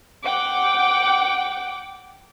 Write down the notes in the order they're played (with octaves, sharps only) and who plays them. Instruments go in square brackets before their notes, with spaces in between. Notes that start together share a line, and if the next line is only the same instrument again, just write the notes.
[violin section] F#5 G5 D6